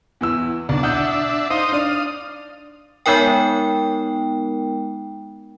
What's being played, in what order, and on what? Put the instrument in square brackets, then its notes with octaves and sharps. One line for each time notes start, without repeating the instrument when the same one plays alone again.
[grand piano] E2 E3 E6
[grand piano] B1 [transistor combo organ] D4
[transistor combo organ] D4 E5 [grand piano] F#5 D#6 G6
[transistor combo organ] D#4 C5 D#6 [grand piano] F5
[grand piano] D4 D5 [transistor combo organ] F5 D#6
[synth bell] G#3 B3 D#4 A#4 G5